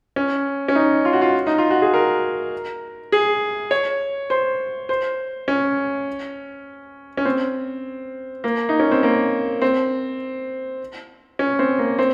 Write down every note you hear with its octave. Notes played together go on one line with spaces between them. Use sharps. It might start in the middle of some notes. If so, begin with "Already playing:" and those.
C#4
C#4
D#4
F4
F#4
F4
D#4
F4
F#4
G#4
A#4
G#4
C#5
C5
C5
C#4
C#4
C4
A#3
D#4
C#4
C4
A#3
C4
C#4
C4
A#3
C4